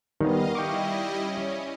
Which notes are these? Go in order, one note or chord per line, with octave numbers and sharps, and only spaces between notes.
D#3 G3 B3 D#5 F5
G3 E4 D#5 G5 C#6 D6
C#4